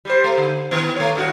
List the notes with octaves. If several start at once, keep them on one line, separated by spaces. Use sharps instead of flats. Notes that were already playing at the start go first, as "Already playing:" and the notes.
G3 G4 C5
A3
D3
D#3 B3
A3 C#5
G2 D#3 F#4